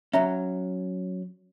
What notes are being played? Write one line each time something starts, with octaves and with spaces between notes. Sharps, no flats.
F#3 C#4 E5 A#5